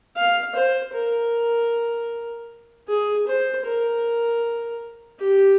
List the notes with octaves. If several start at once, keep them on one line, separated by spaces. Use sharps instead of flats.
F5
C5
A#4
G#4
C5
A#4
G4